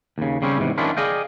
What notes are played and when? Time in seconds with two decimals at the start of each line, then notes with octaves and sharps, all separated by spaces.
0.18 D#2 C#3
0.42 C#3 G3 C4 C#4
0.58 E2 G#2 C3
0.78 D#3 F3 C#4 D4 E4 F4
0.97 G#4 D5 D#5 F5 G5